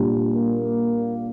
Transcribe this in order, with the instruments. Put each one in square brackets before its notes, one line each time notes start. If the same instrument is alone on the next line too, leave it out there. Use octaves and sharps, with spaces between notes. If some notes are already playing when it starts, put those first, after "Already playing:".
Already playing: [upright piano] A#2 G3 D4 G4
[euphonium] A#3